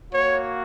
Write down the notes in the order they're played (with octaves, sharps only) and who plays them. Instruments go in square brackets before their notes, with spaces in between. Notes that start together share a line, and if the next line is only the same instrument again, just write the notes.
[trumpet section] A#3 F#4 C#5